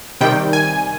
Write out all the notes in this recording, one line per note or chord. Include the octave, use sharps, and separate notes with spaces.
C3 D#3 G3 G5
G#5